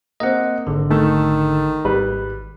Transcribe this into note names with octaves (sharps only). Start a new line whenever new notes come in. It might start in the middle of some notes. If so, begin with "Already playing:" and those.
A#3 C4 D#5 F#5
G#1 D3
D#3 A3 A4
G#1 G3 B4